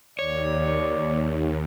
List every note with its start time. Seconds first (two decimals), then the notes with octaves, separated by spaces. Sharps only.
0.19 D#2 C#5 D5